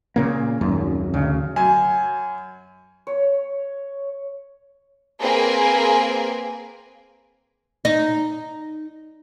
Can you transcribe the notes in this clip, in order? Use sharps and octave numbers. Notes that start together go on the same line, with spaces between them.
A#2 C#3 A#3
D#1 G#1 F#2
D2 C#3
F#2 G#5
C#5
A#3 C4 G#4 A#4 B4 G#5
D#4